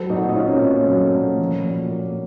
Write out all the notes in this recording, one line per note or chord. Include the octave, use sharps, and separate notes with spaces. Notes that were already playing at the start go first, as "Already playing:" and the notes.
Already playing: F#3 A4 C5
A#2 D#4 F#4
D#4
A#3 C#4 F4
A#2 C#4
F#3
A#2
F3
A#2
A#3